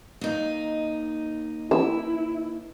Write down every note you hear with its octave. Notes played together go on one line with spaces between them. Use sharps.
D#2 D#4
E4 E6